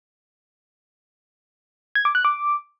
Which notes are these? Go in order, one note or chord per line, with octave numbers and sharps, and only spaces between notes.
G#6
D6
F#6
D6